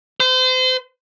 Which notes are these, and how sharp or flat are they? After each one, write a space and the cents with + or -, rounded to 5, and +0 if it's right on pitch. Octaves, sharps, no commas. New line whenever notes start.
C5 -35